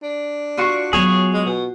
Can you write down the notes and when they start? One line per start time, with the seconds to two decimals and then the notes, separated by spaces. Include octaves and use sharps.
0.03 D4
0.57 F4 F#4 C#6
0.93 F#3 B3 G#4 C#5
1.34 G#3
1.46 B2